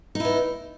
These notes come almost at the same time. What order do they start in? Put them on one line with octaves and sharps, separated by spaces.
D#4 E4 B3